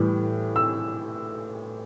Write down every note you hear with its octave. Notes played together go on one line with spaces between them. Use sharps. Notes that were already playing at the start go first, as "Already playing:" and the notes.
Already playing: A2 E3 G3
E6